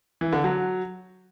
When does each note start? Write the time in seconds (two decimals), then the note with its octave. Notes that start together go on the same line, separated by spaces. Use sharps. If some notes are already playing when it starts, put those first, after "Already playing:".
0.21 E3
0.33 D3
0.44 F#3